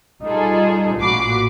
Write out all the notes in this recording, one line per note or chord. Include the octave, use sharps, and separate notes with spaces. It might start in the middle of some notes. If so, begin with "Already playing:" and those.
G3 D#4 F4 G#4 A4
A1 A#2 F#4 B5 D6 C7